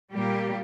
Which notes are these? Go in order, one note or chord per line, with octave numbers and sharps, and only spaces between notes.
A#2 G3 A#3 G4